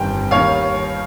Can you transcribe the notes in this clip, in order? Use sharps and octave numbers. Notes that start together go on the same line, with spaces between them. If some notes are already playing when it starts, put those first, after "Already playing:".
Already playing: G1 F2 D#3 G3 G5
D#2 D#3 G3 C#5 F5